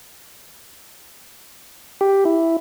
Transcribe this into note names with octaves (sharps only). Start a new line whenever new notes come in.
G4
E4